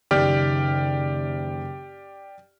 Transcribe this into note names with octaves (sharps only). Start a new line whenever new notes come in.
F#1 D#3 G4 D5 F6